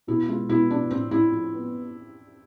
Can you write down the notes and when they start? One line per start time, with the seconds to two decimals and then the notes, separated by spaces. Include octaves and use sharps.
0.07 B2 E4
0.28 G#3 F4
0.49 B2 E4
0.70 F3 D4
0.90 A2 C4
1.11 A2 E4
1.32 F3
1.54 B3